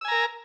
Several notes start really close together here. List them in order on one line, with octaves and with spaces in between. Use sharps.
E6 G#5 A#5 A#4